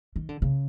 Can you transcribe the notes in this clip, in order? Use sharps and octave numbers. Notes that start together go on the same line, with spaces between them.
D#3
D3
C#3